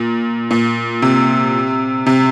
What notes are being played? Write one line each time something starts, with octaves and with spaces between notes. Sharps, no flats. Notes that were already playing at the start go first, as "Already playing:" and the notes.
Already playing: A#2
A#2
C3
C3